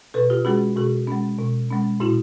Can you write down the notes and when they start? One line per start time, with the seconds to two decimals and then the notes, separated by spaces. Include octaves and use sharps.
0.14 B2 A4 B4
0.30 F4 G4
0.45 G#3 C#4 F#4 G#4
0.77 B2 F#4 G#4
1.07 G#3 C#4
1.39 B2
1.70 G#3 C#4
2.00 A#2 E4 F#4